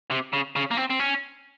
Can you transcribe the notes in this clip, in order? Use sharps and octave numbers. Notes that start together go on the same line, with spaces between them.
C3
C#3
C#3
A#3
C4
C4
C#4